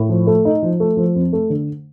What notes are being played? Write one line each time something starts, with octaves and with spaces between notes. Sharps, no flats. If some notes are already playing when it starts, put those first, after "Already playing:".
Already playing: A2
F3
A3
D#4
F3
A3
F3
F2
A3
D3